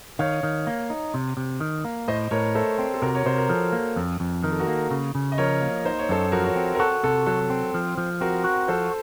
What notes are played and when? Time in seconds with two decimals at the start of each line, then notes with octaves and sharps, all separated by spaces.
0.19 D#3 C#5 F5
0.43 D#3
0.67 A#3
0.90 D#4
1.14 C3
1.37 C3
1.60 D#3
1.85 A#3
2.08 A2 C5 D#5
2.31 A2 A#4 C#5
2.55 A3 A4 C5
2.79 C4
2.94 A4
3.02 C3 F#4 A#4
3.15 C#5
3.26 C3 C5
3.38 A#4
3.49 F3 A4
3.73 A#3
3.96 F2
4.20 F2
4.43 D#3 A#4
4.52 A4
4.59 F#4 A#4
4.67 A#3
4.91 C#3
5.15 C#3
5.32 D#5
5.38 F3 A#4 C#5
5.61 A#3
5.85 D#4 C5
5.99 C#5
6.09 F#2 A4 C5
6.32 F3 F#4 A#4
6.44 A#4 C#5
6.56 C4
6.75 A#4
6.79 F#4 A4
7.03 C3 A4
7.26 F#3 A4
7.50 C4
7.74 F3
7.97 F3
8.21 C4 F#4 A#4
8.44 F#4
8.68 F3 A4 C5